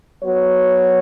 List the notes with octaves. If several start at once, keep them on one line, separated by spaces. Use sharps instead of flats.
F#3 B3 F#4 C#5